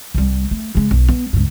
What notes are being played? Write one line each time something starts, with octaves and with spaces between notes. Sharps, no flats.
C2 G3
A3
C#3 G#3
B1
B3
C#2 G2